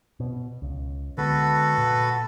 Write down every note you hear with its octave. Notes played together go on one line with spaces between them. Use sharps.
B2
C#2
D3 G#3 B3 F#4 A4 B4
A#2